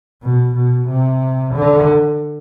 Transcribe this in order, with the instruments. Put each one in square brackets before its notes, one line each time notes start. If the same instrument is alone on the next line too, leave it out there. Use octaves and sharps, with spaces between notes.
[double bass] B2
B2
C3
D3